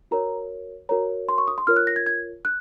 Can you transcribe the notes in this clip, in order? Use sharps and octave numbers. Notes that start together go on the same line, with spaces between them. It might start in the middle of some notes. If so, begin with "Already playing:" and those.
F#4 A#4 C#5 A#5
F#4 A#4 C#5 A#5
C6
C#6
D#6
C6
F4 A#4 C#5 F6
F#6
A#6
G#6
G#6
F#6